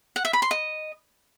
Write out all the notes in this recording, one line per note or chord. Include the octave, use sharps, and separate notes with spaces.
F#5
E5
B5
C6
D#5